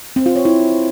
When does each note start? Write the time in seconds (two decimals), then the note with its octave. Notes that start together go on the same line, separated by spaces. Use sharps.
0.16 C4
0.26 F4
0.36 C#5
0.45 E4